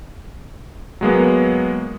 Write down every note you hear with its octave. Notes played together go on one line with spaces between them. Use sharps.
F#3 G#3 A#3 B3